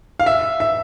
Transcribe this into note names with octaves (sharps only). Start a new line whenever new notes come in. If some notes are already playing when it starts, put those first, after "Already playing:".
F5
E5
E5